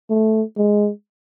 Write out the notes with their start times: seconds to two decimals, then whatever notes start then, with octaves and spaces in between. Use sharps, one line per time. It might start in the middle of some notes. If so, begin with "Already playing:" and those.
0.10 A3
0.57 G#3